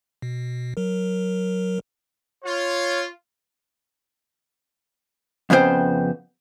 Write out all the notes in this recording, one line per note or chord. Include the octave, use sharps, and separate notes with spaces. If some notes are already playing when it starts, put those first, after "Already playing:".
B2
F#3 A#4
F4 C#5
F2 C#3 B3 E4 C5 G5